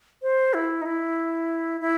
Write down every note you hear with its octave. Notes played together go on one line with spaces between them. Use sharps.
C5
E4
D#4
E4
E4